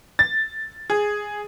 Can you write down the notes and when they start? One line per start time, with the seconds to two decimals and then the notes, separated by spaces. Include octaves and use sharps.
0.19 A6
0.90 G#4